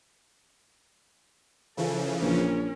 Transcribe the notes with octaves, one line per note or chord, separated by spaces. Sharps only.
C#3 E3 F3 A4
A#1 C#4 A#4